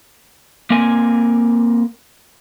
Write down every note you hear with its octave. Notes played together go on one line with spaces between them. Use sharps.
A#3 C4 A#4 G#5